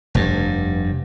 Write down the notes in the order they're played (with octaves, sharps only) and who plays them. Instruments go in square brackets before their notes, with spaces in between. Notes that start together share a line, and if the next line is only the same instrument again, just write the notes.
[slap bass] F1 G2